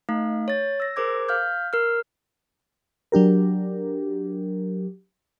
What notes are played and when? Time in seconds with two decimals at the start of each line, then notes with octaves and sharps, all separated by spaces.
0.09 A3 D#4 F5
0.48 C#5 A6
0.80 E6 A#6
0.96 G#4 A#4 C5 D6 G#6
1.28 F5 F6 G6
1.73 A#4 F6
3.12 F#3 D4 G4 A#4